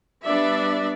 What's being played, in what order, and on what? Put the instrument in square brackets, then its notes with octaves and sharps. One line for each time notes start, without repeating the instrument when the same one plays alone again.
[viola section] G3 B3 D4 D5 E5